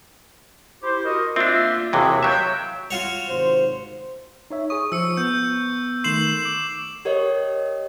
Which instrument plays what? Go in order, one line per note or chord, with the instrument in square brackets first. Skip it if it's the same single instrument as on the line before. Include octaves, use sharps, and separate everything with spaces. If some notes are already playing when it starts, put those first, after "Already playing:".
[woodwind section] E4 G4 C5
F#4 A#4 D#5
[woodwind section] A#3 F4 E5 [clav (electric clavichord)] C4 D4
[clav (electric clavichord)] D#2 C3 E3 [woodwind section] F#4 G#4 E5
[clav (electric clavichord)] F#3 E5 [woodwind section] C#5 F5 G5
[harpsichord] F4 F#4 C#5
[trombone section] G#1 C3 C5
[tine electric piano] D#4 C#5 E5
[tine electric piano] G#4 D#6 [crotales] C#6
[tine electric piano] F3 [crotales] E6 C#7
[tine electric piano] B3 [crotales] G6
[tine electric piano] D#3 A3 C6 [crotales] C7 E7 F#7
[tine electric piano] D6
[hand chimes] G4 A#4 C#5 D#5